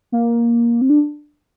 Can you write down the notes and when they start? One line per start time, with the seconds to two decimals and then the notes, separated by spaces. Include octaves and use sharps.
0.12 A#3
0.81 C4
0.90 D4